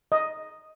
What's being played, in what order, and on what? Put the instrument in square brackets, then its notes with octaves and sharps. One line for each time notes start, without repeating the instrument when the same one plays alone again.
[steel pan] D#5